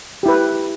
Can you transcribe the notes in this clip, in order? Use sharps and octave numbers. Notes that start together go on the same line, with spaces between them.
E4 G4 B4